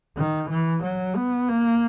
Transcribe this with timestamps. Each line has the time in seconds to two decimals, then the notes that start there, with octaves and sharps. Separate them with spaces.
0.17 D#3
0.50 E3
0.84 F#3
1.16 B3
1.49 A#3